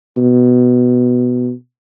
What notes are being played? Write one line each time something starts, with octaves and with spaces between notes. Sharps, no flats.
B2